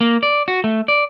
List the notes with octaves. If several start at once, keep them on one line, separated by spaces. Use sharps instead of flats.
A#3
D5
F#4
A3
D5